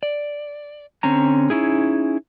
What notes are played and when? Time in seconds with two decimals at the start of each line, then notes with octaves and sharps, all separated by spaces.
0.03 D5
1.03 D3 C4 C#4 A#5
1.50 C#4 D#4 E4 G#4